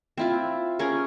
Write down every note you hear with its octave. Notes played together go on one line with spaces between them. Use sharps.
C4 E4 F4
C#4 G#4 A#4 C#5